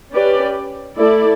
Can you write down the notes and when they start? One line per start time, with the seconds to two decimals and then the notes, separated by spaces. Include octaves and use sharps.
0.12 C#4 G4 B4 D5
0.96 A3 E4 A4 D5